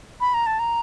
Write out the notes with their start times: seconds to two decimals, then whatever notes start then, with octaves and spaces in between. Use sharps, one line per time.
0.21 B5
0.34 A#5
0.46 A5
0.59 A#5